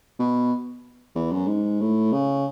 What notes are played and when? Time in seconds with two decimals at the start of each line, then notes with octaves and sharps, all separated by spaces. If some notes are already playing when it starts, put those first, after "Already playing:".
0.19 B2
1.15 E2
1.32 F#2
1.47 G#2
1.80 A2
2.12 C#3